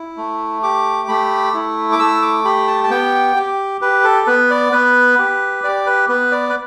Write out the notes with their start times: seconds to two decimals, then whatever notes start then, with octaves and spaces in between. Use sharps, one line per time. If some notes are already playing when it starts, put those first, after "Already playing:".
Already playing: E4
0.17 A3
0.63 G4 D6
1.08 A3 B5
1.54 E4
1.92 D6
1.99 A3 E6
2.22 D6
2.45 G4 B5
2.68 A5
2.84 A5
2.90 B3 G5
3.36 G4
3.81 G4 B4
4.04 A4
4.27 B3 B4
4.50 D5
4.72 B3 B4
5.19 G4
5.64 G4 D5
5.86 B4
6.09 B3 B4
6.32 D5
6.50 B4